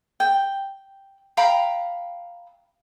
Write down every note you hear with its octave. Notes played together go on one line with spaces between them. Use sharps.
G5
F5 G5 A#5 B5